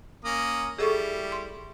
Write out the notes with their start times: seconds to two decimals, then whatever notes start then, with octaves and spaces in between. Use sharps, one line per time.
0.25 A#3 C#4 D#6
0.79 G3 E4 G#4 A4 C#6
1.32 C6